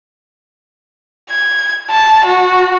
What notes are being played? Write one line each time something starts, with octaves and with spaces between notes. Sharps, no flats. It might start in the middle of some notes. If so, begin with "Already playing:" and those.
G#6
A5
F#4